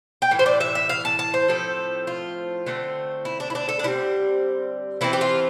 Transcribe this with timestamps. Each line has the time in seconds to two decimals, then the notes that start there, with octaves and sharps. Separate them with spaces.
0.22 G5
0.31 A2 E3
0.39 C5
0.46 D5
0.60 E5
0.75 E5
0.89 F5
1.05 A5
1.19 A5
1.34 C5
1.48 A2 F3 A3 C4 A4
2.07 F4
2.66 D3 A3 C4
3.25 E4
3.40 D4
3.50 E4
3.55 D4
3.69 A4
3.79 D4
3.83 D3 G3 C4 E4
5.01 E3 A3 C4 E4
5.13 G4
5.21 F4